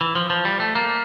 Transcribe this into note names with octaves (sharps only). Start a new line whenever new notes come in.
E3
F3
F3
G3
A3
A#3